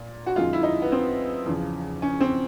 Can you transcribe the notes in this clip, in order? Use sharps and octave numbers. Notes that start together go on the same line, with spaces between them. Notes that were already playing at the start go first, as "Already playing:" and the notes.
Already playing: A#2
F#4
F#2 D#3 G#3 F4
E4
D#4
B3
C4
E2 C#3 F3
C#4
C4